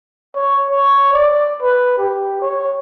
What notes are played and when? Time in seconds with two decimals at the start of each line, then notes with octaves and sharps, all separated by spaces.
0.35 C#5
0.70 C#5
1.13 D5
1.62 B4
1.98 G4
2.42 C#5